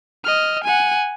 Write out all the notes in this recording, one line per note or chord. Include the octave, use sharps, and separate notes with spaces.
D#5 F6
F#5 G#5